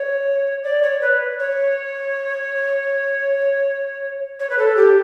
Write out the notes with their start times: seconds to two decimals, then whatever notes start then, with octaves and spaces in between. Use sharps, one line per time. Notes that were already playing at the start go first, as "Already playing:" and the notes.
Already playing: C#5
0.63 D5
0.82 C#5
1.01 B4
1.39 C#5
4.39 C#5
4.49 B4
4.58 A4
4.76 G4